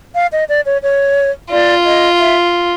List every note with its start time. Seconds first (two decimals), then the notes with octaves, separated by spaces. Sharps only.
0.15 F5
0.32 D#5
0.49 D5
0.66 C#5
0.83 C#5
1.51 F4 D5
1.85 D#5
2.20 E5